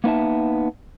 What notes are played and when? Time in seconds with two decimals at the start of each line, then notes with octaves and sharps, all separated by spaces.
0.04 A#3 B3 D#4 E5 A5